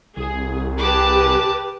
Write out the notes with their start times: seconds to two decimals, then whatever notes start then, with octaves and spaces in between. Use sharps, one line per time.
0.17 C2 G#4
0.78 G4 G#4 B4 A5 D6